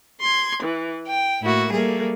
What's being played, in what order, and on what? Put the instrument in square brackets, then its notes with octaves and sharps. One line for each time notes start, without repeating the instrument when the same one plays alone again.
[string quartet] C6 G#6
E3
G5
A2 A#3 E4 F#4
G3 A3 A#3 G#4